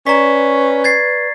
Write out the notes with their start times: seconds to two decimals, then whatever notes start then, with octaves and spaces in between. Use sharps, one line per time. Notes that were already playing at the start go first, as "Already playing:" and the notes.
0.07 C#4 B4 D5 A#5 C#6 B6
0.84 G#6 A6 C7